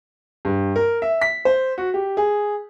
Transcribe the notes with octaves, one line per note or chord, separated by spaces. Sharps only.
G2
A#4
E5
B6
C5
F#4
G4
G#4